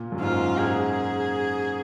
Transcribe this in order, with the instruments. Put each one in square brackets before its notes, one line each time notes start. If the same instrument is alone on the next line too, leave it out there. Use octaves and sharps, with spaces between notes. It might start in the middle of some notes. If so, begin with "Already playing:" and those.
Already playing: [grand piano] A#2
F#2
[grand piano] G#2 [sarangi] F4
[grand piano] G#2 [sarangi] G#4